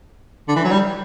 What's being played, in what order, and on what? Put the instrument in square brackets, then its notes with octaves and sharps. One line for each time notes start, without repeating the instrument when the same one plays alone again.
[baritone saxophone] D3
E3
F#3
G3